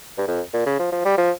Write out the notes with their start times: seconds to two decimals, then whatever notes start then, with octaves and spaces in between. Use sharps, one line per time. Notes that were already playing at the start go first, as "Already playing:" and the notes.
0.18 G2
0.28 F2
0.53 A#2
0.66 C#3
0.79 F3
0.92 F3
1.05 G3
1.18 F3